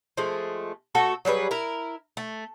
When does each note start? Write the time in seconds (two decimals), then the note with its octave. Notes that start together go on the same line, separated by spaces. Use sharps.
0.17 F3 G#3 A3
0.95 A3 F#4 A4
1.25 F#3 G3 G#4 B4
1.51 E4 A#4
2.17 A3